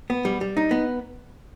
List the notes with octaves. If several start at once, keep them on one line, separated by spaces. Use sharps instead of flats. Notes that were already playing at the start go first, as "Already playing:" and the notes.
B3
G3
G3
D#4
B3